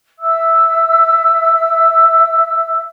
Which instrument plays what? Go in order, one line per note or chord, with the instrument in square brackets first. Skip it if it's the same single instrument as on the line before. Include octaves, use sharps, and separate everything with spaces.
[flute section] E5 E6